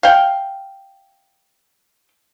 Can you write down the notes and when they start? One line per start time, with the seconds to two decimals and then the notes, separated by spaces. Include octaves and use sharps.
0.03 F5 G5